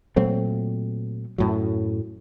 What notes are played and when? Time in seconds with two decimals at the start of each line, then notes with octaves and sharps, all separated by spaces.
0.16 A#2 F#3 A3 C4
1.38 F#2 A2 F#3